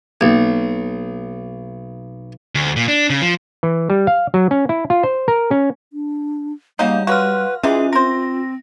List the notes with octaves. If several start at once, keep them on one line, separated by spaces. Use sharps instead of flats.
B1 A#3
D2
A#2
D4
C#3
F3
E3
G3
F5
F#3
C#4
E4
F4
C5
A#4
C#4
D4
C#3 F#3 G3 A#3 D#4 F5 G6
F#3 F#4 B4 F5 C6 F6
E3 G#3 C#4 D#4 F4 G#4 E5
C4 A#4 C5 A#6